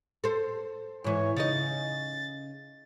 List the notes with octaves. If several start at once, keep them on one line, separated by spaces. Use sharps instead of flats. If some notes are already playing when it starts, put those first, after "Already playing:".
A4 C5
G#2 E3 C#5
C#3 D#4 D#5 A6